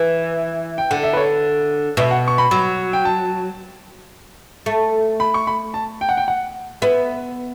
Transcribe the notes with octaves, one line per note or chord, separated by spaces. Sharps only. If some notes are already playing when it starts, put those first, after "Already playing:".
Already playing: E3
G5
D3 F#5
E5
B4
C#5
B2 E5
F#5
C#6
B5
F#3
G5
A5
A3
B5
C#6
B5
A5
G5
F#5
G5
F#5
B3 E5